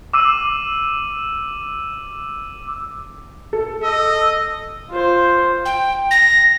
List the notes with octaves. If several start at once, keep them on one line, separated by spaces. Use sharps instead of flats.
D6 E6 D#7
A4
D#5 E6
F4 C5
G5
A#6